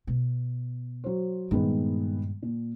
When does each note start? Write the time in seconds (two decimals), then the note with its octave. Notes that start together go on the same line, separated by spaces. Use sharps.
0.07 B2
1.04 F#3 C5
1.51 G2 A#2 D#3 G#3 B3
2.42 A#2